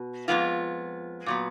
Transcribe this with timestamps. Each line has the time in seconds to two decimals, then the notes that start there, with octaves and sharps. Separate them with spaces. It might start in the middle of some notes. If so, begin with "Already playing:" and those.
Already playing: B2
0.28 F2 D#3 G#3 B3 F4
1.26 A#2 F#3 B3